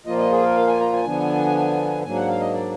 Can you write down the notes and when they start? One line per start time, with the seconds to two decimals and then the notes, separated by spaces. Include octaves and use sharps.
0.06 A#2 F3 A#3 F4 D#5
0.18 D#5
0.31 G#4
0.43 A#4
0.56 F5
0.68 G#5
0.80 A#5
0.93 G#5
1.05 D3 F3 B3 D4
2.04 G#2 F#3 A#3 D4 G#5
2.16 F#5
2.28 F5
2.40 D#5
2.53 D5